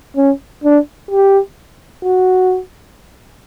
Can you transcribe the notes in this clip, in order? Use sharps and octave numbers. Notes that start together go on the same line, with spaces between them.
C#4
D4
G4
F#4